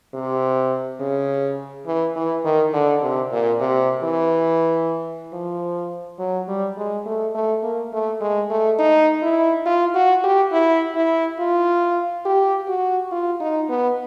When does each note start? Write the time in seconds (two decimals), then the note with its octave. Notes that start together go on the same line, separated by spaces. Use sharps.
0.14 C3
1.00 C#3
1.86 E3
2.16 E3
2.45 D#3
2.73 D3
3.02 C3
3.32 A#2
3.60 C3
4.03 E3
5.33 F3
6.19 F#3
6.48 G3
6.77 G#3
7.06 A3
7.35 A3
7.63 A#3
7.93 A3
8.21 G#3
8.50 A3
8.79 D#4
9.22 E4
9.66 F4
9.95 F#4
10.23 G4
10.52 E4
10.95 E4
11.39 F4
12.25 G4
12.68 F#4
13.12 F4
13.40 D#4
13.69 B3